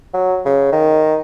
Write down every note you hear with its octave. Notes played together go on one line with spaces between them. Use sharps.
F#3
C#3
D#3